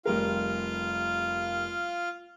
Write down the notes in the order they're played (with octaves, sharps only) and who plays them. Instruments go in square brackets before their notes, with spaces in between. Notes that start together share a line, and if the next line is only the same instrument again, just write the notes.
[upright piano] F1 G3 A#4 [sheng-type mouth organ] F4 F5